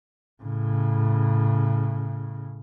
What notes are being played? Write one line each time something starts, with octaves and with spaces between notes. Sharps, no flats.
A2 C#3